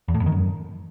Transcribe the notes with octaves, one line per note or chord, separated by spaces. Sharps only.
E2
A2
F2
D#3
F#2